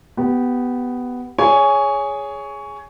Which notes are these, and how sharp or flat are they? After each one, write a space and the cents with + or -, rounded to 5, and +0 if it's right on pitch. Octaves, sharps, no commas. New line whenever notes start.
B3 +5 G4 -10
G#4 +0 C#5 +15 G#5 +0